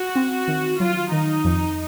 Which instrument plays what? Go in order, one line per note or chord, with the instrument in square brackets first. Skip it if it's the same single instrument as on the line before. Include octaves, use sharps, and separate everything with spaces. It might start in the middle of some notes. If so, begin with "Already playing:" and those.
Already playing: [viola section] F#4
[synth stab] C4
D#3
[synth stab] F#3 [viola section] F4
[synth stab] D#3 [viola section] D#4
[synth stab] F2